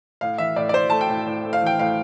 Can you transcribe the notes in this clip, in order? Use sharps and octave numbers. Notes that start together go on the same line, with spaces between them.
A2 F5
E3 E5
A2 D5
D5
A2 C5
A3 A5
G5
A2
A2
A3
F5
E3 G5
A2 F5